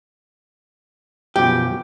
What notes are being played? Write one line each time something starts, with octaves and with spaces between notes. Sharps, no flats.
F#2 B2 F3 G4